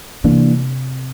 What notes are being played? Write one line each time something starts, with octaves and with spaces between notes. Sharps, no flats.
C3 E3 A#3 D4